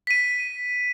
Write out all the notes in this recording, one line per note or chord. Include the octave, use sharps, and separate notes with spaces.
B6 D#7